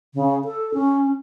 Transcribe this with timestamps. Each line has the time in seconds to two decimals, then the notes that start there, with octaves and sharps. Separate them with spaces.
0.14 C#3
0.45 A4
0.74 C#4